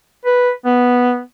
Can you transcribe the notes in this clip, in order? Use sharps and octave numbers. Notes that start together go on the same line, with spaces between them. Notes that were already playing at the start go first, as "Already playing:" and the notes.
B4
B3